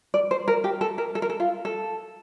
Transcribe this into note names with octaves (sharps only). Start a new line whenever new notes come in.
D5
C5
A#4
G4
A4
A#4
A4
A#4
A4
F4
A4